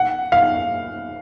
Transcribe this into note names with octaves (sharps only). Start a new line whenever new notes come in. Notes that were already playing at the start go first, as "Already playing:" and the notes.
Already playing: F#5
F5